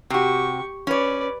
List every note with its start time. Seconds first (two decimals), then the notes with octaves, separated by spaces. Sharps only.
0.10 C3 F#4 G4 C#6
0.87 C#4 B4 C#5 D5